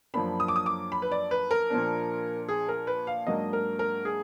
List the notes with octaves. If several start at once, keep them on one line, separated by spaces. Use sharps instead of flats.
F#2 F3 A#3 D4 B5
D#6
D6
D#6
D6
B5
B4
D5
B4
A#4
A#2 F3 A#3 D4
G#4
A#4
B4
F5
G#2 F#3 A#3 D4 D#5
A#4
A#4
G#4